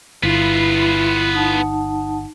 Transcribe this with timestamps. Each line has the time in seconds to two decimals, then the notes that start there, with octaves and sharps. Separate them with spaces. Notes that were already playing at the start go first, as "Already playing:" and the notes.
0.23 G1 B3 E4 F4
1.34 D#4 F#5 A5